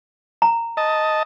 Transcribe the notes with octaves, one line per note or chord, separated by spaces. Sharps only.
A#5
D#5 A5